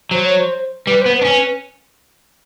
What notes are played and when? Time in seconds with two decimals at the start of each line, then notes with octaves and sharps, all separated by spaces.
0.11 F#3 C5
0.26 C#5
0.39 C5
0.87 G3 B4
1.01 B3 C5
1.15 B4
1.21 D4
1.25 C#4